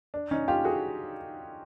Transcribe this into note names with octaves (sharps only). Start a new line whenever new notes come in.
D4
C#4 D#4
F4 G4
F#4 G#4